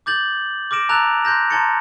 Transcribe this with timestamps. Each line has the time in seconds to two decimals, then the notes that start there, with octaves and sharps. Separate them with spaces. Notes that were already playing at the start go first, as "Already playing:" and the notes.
0.06 D6 G6 A6 F#7
0.71 D6 F6 A#6 D7 E7
0.89 A5 A#5 E6 F#6 A6 F7
1.24 C6 F#6 G6 A#6 E7
1.50 A5 A#5 C6 G#6 A6 C#7